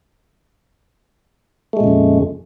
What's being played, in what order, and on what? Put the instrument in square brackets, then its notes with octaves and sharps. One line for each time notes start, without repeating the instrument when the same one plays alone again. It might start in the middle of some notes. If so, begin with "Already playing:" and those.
[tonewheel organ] A3
G#3
A#2
C#3
F2